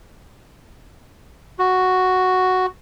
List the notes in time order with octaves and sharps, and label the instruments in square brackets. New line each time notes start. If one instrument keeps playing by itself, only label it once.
[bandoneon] F#4